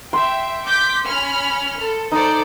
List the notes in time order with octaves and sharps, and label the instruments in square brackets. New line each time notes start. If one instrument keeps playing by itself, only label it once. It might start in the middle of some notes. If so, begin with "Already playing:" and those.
[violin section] E5 G5 [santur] C6
[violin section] D6 G6 B6
C#4 B5 F6
A4
[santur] D#4 [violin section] A4 C5 D5